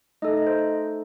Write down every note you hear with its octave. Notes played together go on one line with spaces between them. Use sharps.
A3 D#4 A4 D#5
D#5
C5